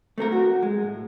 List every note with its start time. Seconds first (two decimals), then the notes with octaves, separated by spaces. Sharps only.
0.18 A3 C4 A4 A#4
0.32 F#4
0.62 G#3
0.83 A2